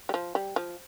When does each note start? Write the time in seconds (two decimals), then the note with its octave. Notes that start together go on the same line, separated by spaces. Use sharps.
0.09 G3
0.14 F3
0.35 G3
0.56 F3